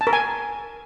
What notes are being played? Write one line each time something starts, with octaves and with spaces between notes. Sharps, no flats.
A5
A#4
G#5